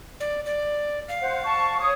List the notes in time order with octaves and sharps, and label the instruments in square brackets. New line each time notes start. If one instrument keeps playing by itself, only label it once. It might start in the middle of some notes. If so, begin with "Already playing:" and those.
[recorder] D5
D5
F5
[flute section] C5 F#5
A5 C#6
C#5 C#6 D#6